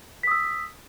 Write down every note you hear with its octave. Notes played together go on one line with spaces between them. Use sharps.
D#6 E6 B6